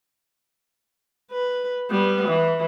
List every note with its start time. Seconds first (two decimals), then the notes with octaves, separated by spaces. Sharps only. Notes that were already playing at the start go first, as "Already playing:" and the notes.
1.31 B4
1.90 G3 B3
2.28 E3